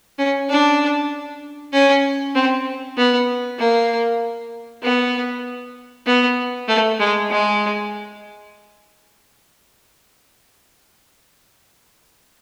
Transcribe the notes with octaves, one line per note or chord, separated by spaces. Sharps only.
C#4
D4
C#4
C4
B3
A#3
B3
B3
A3
G#3
G#3